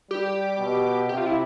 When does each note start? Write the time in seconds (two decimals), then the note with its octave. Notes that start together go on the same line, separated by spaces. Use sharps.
0.10 G3 G4
0.59 B2
1.09 C3 G4
1.17 F4
1.26 E4